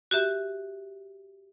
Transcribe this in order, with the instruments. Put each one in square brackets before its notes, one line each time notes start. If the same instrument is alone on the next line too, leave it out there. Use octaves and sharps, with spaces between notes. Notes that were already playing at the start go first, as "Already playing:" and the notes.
[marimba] F#4 G4 E5